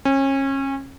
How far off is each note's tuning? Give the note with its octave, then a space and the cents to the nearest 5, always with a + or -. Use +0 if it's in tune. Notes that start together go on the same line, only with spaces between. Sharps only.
C#4 -30